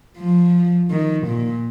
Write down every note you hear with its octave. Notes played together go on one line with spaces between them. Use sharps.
F3
D#3
A#2